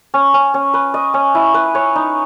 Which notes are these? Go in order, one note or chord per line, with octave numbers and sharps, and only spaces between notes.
C#4
C#4
C#4
B4
D#5
C#4
E4
B4
C#5
D#4